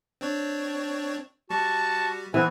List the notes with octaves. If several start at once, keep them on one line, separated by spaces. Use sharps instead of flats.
C4 D4 C#5
G3 F#4 A5 C#6
E3 B3 C4 G#5